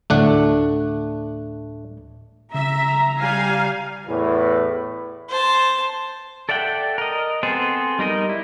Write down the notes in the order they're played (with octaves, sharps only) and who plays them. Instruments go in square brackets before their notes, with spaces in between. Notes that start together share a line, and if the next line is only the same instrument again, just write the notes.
[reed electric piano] D2 A2 [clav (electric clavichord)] A3 D4 F#5
[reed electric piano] C#3 [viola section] E5 [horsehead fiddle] A#5
[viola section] G3 F5 G#5
[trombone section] E2 A2 E3 B4
[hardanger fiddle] C5 A5
[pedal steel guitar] A4 D5 E5 F#5 G5
A#4 D#5
B3 C4 G#4 A4 C5
G3 D#4 A#4 D#5
E4